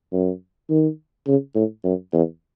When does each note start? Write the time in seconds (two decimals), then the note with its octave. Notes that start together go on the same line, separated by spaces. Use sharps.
0.13 F#2
0.70 D#3
1.27 C#3
1.55 A2
1.84 F#2
2.13 E2